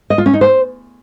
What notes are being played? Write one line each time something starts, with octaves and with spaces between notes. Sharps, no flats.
D#5
F4
C#4
D#4
C5